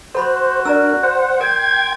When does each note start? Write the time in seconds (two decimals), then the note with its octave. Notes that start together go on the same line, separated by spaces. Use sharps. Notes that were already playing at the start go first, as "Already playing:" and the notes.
0.15 F#4 A4 C5 B5 C6
0.65 D4 A#4 D5 A#5 E6
1.03 C5 F#5
1.41 A#4 G5 C6 G#6